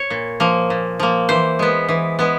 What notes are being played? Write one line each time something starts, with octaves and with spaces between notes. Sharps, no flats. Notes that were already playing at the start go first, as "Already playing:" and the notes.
Already playing: C#5
A#2
F3 A#3
A#2
F3 A#3
E3 C5
G#3 B3
E3
G#3 B3